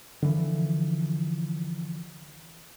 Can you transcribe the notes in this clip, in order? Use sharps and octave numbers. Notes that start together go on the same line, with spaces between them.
D3 E3 F3